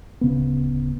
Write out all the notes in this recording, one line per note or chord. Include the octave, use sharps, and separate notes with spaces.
D1 C#3 B3